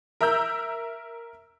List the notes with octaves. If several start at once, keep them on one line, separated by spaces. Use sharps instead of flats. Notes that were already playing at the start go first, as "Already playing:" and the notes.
A#4 E5 A#5 E6 G6